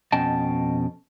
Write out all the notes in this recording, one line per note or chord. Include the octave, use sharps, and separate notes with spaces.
F2 B2 C#4 D#5 G5 A5